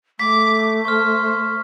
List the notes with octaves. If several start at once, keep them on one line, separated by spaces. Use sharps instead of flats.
A3 D6 B6
C5 C#6 F6